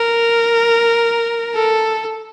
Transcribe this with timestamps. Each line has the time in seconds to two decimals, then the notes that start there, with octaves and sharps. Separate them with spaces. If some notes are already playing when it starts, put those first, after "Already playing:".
Already playing: A#4
1.55 A4